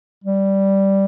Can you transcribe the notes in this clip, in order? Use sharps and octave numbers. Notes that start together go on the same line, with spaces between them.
G3